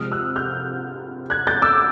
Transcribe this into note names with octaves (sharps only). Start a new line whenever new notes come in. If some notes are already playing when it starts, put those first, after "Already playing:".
Already playing: C3 F3 G#3 D#6 F6
E6 F#6
F6 G6
F#6 G#6
G6 A6
D6 E6